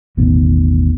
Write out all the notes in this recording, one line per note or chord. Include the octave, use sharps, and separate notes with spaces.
E1 A1 D#3 B3